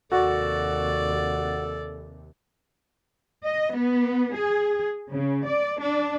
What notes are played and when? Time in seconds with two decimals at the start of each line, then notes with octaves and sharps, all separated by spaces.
0.12 D#2 C3 F#4 A4 D5
3.44 D#5
3.75 B3
4.36 G#4
5.10 C#3
5.47 D5
5.82 D4